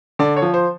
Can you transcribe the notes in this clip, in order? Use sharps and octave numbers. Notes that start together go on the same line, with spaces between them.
D3 D5
C#5
F3
C5